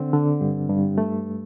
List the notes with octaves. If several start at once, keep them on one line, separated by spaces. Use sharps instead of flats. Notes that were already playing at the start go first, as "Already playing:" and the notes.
Already playing: D3 C4
D3
G2
G2
A3